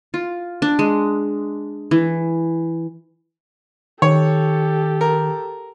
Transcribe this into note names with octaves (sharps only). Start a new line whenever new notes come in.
F4
D4
G#3
E3
D#3 G4 A4 C#5
A#4